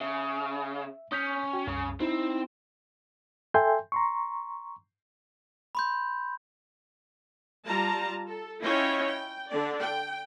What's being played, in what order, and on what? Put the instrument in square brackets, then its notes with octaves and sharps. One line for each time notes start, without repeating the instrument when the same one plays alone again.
[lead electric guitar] C#3 [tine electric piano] E5
[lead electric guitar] C#4 [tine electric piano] D#6 G6 B6
[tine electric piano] F#4 G5
[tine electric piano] C2 F#2 [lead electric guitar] C#3
[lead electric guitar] C4 [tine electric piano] D#4 E4
[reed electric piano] A4 E5 G5 G#5 C6 G6
A#5 C6 C#6
[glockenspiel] B5 C6 G6
[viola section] G3 F4 A5 A#5
A4
C#4 E4 F4 C#5 D#5 G5
G5
D3 D4 D5
G5